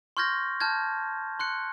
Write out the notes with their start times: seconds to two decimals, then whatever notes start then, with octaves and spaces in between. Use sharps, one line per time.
0.17 C6 C#6 F6 G6 G#6 A#6
0.60 A5 F6 G6 G#6
1.39 C6 F#6 C#7